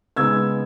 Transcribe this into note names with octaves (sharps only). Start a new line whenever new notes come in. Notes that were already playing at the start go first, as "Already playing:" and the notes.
C#3 G#3 B3 D#4 E6 G#6